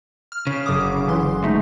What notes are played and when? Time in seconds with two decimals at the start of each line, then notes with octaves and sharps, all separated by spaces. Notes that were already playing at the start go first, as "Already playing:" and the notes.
0.32 F6
0.47 C#3
0.66 F#1 D6 D#6
1.07 D3 E3 C6
1.43 G#3 A3 D#4